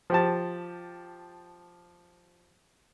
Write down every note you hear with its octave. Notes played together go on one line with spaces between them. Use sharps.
F3 G4 A5